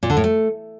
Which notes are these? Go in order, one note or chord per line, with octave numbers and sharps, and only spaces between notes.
A#2
D3
A2
A3